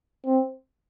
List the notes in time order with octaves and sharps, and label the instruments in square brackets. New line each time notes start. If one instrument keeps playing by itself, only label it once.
[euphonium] C4